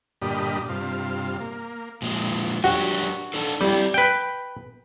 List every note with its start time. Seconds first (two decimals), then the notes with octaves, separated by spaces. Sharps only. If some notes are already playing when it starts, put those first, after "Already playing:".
0.22 G2 A#2 D3 G4 D#5 B5
0.69 G2 C3 F4
1.40 A#3
2.02 A#2 F3 G#3
2.64 F#3 D4 F#4 G4
3.34 D4 D#4 A4
3.61 G3 C4 E4
3.94 B4 G5